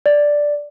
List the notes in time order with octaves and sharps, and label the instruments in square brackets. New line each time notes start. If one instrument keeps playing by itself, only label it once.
[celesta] D5